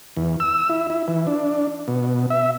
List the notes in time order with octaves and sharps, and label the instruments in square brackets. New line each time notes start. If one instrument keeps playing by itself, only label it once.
[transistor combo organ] E2
E6
E4
E4
E3
D4
B2
E5